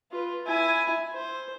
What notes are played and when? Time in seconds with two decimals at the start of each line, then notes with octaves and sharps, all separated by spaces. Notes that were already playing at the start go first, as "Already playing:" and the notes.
0.11 F4 B4
0.46 E4 G#5
1.13 C5